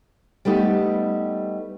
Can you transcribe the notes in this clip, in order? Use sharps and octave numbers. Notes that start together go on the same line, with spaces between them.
G3 A3 B3 D#4 G4